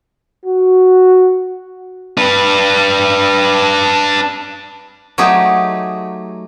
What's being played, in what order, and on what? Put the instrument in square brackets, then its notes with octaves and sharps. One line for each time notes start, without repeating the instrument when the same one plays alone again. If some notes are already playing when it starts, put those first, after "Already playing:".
[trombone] F#4
[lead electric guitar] D4 B4
[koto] F#3 A3 D#4 G4 G#4